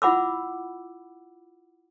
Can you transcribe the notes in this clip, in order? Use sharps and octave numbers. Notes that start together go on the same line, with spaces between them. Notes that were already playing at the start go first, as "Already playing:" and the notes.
E4 F4 F#5 B5 D6 E6